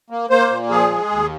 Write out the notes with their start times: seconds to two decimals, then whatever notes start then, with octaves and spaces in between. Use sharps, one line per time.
0.10 A#3
0.30 A#3 C5
0.50 A#2
0.70 F3 G#4
0.90 G#3
1.11 D#2